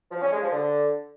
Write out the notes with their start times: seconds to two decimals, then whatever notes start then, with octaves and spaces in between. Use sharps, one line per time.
0.11 F3
0.21 C#4
0.32 G#3
0.42 F3
0.52 D3